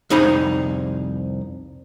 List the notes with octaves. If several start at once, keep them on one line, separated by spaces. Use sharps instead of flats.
C2 F2 D#4 G#4 A#5 B5